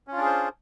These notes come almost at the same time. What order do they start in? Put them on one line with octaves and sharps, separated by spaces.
C#4 F4 D4 G#4 C5